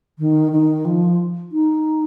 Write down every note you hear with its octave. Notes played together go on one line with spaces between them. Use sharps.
D#3
D#3
F3
D#4